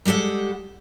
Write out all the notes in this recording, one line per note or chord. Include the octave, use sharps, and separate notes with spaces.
G3 G#3 G4 A4 F#5